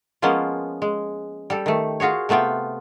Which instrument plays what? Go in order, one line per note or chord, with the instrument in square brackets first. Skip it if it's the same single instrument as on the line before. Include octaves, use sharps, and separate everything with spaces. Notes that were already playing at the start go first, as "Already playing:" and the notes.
[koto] F3 G#3 A#3 B3 C#4 F4
G#3
G3 G4 A4
D#3 A3
F4 F#4 G#4 C#5
C3 A3 B3 F4 G5